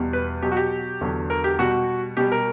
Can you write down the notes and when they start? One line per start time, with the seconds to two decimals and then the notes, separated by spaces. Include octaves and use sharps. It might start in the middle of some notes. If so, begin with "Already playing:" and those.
Already playing: E2 B2 G3
0.13 B4
0.42 B2 F#3 G4
0.52 F#4
0.57 G4
1.01 E2 D3 F#3
1.30 A#4
1.44 G4
1.59 B2 G3 F#4
2.17 B2 G3 G4
2.32 A#4